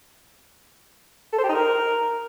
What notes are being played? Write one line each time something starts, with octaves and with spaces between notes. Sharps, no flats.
A4
C5
G4
D#4
A#4